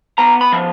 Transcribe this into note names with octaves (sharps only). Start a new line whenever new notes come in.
B3 A#5
B5
F3